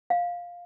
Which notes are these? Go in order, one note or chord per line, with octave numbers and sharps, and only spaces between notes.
F5